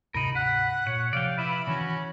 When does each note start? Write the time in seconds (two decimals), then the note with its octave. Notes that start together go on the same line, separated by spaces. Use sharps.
0.14 D2 G#2 C3 D#4 A#4 B5
0.35 F#5 B5 F#6
0.87 A#2 C#5 F#5
1.13 C3 F3 D5 F5 G5
1.38 E4 B4 D5 E5 B5
1.67 C3 D#3 E3 C#4 F#4